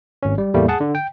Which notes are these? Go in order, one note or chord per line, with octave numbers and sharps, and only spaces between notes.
G#1 C#4
G3
E2 A2 G3 A3 A#3
G#4 F#5 A5
D3
G5